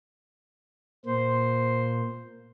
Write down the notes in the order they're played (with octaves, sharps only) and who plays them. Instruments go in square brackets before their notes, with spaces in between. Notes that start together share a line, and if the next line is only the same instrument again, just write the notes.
[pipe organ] A#2 A#3 [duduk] C5